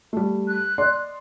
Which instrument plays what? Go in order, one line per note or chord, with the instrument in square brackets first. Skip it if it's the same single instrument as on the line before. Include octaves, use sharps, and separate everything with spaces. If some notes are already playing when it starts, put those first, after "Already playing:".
[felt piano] G3 A3
[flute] F#6
[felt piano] D5 D#5 C6